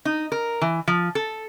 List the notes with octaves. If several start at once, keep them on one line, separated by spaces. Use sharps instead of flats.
D#4
A#4
E3
F3
A4